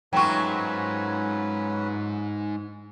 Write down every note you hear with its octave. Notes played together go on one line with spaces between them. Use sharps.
G#2 F#3 A3 C#4 F4 B4 G5 C#6